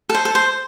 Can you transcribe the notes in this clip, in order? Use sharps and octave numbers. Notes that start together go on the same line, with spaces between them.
A4
C5
A4
C5